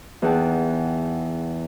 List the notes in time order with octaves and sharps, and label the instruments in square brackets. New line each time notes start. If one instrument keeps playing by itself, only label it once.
[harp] E2 D#4 G#4 F#5 G5 A5